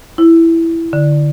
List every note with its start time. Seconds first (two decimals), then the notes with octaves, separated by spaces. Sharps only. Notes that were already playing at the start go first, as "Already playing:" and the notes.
0.18 E4
0.93 D3